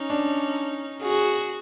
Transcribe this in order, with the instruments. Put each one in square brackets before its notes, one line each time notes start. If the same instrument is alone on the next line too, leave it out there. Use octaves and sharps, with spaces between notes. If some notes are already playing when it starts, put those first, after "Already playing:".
Already playing: [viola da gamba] C#4 D#4
[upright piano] D4
[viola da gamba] F#4 G#4